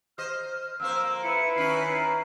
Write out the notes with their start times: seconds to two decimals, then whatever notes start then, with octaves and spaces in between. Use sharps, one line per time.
0.18 C5 D#5 F6
0.80 F2 A#3 C5 E6
1.23 E4 B4 C#7
1.56 D#3 C#4 D#4 C7